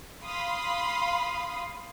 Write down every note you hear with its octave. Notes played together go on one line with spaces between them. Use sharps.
F5 B5 C6 D#6